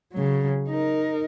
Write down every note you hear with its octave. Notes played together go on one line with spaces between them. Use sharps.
C#3 F#3
D#4 A#4